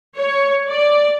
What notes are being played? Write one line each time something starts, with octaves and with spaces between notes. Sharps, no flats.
C#5
D5